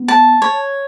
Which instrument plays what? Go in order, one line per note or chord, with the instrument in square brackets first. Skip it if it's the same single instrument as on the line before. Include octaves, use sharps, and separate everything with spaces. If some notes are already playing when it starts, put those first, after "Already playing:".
Already playing: [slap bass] B3
[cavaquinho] A5
C#5